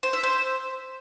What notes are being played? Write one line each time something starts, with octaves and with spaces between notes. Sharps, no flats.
C5
E5
C5